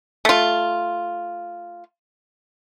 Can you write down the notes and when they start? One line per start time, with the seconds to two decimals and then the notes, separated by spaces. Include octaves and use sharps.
0.25 A3 F4